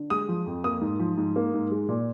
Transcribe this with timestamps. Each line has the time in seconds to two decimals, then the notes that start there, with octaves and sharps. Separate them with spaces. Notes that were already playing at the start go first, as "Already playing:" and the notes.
Already playing: D3
0.10 G#3 D#6
0.28 F3
0.46 F2
0.64 A#3 D#6
0.81 G#2
1.00 F3
1.17 G#2
1.36 A#3
1.54 G#2
1.71 G#3
1.89 A#2